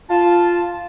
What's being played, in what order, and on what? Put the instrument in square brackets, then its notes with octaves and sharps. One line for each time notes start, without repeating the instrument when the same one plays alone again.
[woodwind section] F4 A5